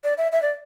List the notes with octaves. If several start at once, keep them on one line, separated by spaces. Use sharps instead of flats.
D5
E5
E5
D5